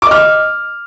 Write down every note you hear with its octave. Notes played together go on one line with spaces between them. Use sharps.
D#5 D6 F6